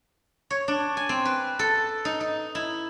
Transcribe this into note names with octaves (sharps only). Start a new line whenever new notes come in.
C#5
D4
G#5
C4
B4
A4
D#4
D#4
E4